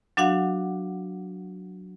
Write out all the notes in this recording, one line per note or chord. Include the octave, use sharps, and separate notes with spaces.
F#3 D4 F#4 F5 F#5